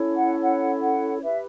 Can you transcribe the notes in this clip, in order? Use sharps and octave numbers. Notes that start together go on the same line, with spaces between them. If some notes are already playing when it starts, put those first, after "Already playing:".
Already playing: C#4 E4 A4 C#5
F#5
F#5
F#5
E4 G4 B4 E5